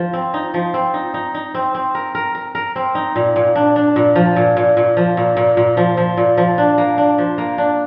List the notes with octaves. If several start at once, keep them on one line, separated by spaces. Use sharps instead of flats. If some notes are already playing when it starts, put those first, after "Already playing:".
Already playing: F3
C4
D#4
F3
C4
D#4
D#4
D#4
C4
C4
A#4
A#4
A#4
A#4
C4
D#4
A#2
A#2
D4
D4
A#2
F3
A#2
A#2
A#2
F3
A#2
A#2
A#2
F3
F3
A#2
F3
D4
A#3
D4
F3
A#3
D4